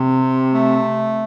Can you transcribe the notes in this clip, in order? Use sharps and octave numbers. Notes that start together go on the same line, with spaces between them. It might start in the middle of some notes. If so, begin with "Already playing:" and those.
Already playing: C3
C4
A3